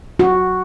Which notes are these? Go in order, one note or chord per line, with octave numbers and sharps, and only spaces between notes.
F#4